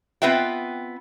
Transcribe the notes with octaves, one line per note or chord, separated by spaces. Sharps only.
B3 C4 F4 B4 E5 G5